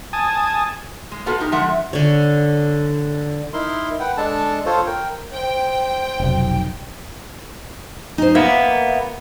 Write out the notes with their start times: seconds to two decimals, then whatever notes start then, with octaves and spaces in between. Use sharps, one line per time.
0.13 G#5 A5 D#6
1.11 G#3
1.26 A#3 B3 F4 F#4 A4 B4
1.40 D#4 G4 A#4
1.52 D3 F3 G#3 E5 F#5
1.93 D3 C#5
3.53 D#4 E4 A#4 C6
4.00 B4 F#5 G5
4.17 G#3 D4 A4 A5
4.66 F4 A4 C5 C#5
4.87 A#4 G5
5.34 C5 G5
6.20 F1 B1
8.18 D#4 C5
8.35 A#3 B3 E5